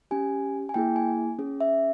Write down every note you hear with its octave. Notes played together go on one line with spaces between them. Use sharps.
C#4 G4 G#5
G#5
A#3 E4 G#4 G5
G#5
C#4 G#4
E5